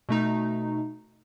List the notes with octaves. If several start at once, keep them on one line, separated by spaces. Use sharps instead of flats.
B2 A3 D#4